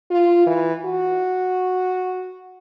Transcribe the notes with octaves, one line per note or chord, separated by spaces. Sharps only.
F4
E3
F#4